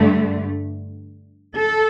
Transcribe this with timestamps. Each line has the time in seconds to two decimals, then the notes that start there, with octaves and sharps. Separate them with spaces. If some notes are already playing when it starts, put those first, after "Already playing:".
Already playing: G2 D3 A3
1.56 A4